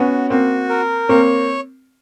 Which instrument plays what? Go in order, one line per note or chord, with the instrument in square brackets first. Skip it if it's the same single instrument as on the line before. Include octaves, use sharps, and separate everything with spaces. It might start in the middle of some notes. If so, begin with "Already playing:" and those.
Already playing: [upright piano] B3 C#4 [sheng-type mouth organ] F#4
[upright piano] A#3 C4 [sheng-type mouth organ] F#4
[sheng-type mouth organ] A#4
[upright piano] A#3 C4 [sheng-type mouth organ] C#5